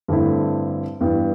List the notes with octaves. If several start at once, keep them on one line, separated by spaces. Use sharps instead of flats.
G2 D3 A3 C4 E4
G2 E3 G3 B3